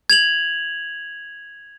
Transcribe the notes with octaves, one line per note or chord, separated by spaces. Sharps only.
G#6 F7 F#7